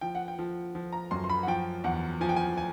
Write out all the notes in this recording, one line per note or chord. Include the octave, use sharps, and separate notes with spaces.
F3 G5
F#5
G5
F3
F3
A#5
F#2 C6
C6
B5
F#5
F3 G5
E2 F#5
F3 G#5
G5
G#5
G#5